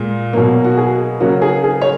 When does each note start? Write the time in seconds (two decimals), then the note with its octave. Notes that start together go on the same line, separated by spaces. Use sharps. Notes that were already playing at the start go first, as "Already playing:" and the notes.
Already playing: A#2 G#3
0.33 B2 F#3 A#3
0.64 F#4
0.77 G#4
1.20 C#3 F#3 A#3 F#4
1.42 G#4
1.64 G#4
1.82 C#5